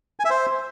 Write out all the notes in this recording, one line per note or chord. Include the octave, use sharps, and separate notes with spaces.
G#5
E5
C5